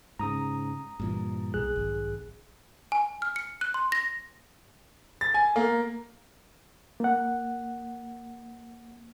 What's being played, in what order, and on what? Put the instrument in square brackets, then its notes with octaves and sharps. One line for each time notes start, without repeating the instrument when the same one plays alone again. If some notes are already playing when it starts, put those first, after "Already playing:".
[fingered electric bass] G#2 C#3 [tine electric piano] A#5 D#6
[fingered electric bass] G2 A#2 E3
[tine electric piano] B1 G#4 F#6
[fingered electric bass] G#1
[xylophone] G#5
F6
C#7
F#6
C6
A#6
[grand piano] A6
G#5
A#3
[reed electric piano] A#3 F#5